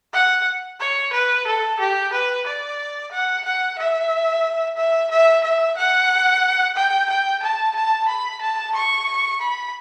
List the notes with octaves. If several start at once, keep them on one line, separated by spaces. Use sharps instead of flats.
F#5
C#5
B4
A4
G4
B4
D5
F#5
F#5
E5
E5
E5
E5
F#5
G5
G5
A5
A5
B5
A5
C#6
B5